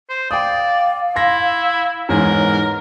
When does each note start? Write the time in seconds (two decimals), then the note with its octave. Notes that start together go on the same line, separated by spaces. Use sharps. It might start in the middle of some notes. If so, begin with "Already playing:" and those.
0.09 C5
0.31 D5 F5 G5 D#6
1.16 E4 C6 A#6
2.09 E2 G#2 A#4 C#5